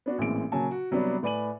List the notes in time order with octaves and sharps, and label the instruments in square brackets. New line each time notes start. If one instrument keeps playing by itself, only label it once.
[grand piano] B3 D4 F#4
A1 A#2 E3 G#3 C4 D7
A#2 C#3 F#3 G#5 A5
F#4
C3 F#3 G3 B3 D4
A2 B4 D5 G#5 D#7 F#7